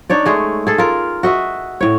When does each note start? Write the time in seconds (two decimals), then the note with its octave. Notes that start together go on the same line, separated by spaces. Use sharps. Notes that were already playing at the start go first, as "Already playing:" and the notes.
0.10 D4 D#4 C#5 D5
0.26 G#3 A3 G#4 D#5
0.67 G#4 A4
0.78 F4 A#4
1.23 F#4 D#5 E5
1.81 A2 C#5